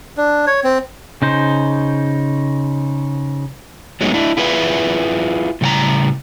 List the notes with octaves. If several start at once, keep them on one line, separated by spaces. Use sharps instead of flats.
D4
C#5
C4
C#3 D#4 C5
F#3 G#3 A3 B3 D#4
A3 D4 E4
E4 F4 G#4 B4 C5 E5
A2 C#3 G3 F#5 G5 A#5